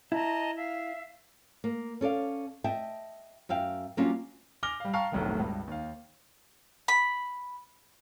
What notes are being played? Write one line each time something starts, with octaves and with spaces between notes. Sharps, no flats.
E4 D#5 A5 A#5
E5 F5
A#3
C#4 A4 D5 F5
D#5 E5 G5 A5
F#2 E5 F5 G5
F#3 G3 A#3 C#4 D4 F4
G#5 D6 F6 A#6 F7 G7
G3 F5
F5 G5 A5 A#5 C#6 F6
F1 B1 A2 D#3
C#2 G2
D#2 F5
B5